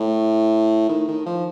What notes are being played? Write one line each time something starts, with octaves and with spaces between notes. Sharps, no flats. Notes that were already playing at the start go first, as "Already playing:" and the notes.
Already playing: A2
D#3
D#3
F3